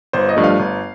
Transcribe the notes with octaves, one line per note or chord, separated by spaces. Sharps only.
G1 C5
D#5
G2 F3 A3
F5
G1